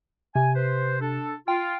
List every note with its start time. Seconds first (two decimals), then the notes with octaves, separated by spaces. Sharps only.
0.35 C3 G#5
0.56 B4 C5
1.01 D4 A4
1.48 F4 G5